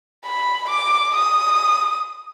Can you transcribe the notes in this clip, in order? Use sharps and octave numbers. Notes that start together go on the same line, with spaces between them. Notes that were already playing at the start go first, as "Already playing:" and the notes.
B5
D6
D#6